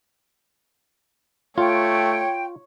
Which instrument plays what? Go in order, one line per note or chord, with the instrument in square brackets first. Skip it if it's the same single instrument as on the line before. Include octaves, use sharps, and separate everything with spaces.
[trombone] A3 [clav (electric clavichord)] F4 [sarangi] C#5 [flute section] G5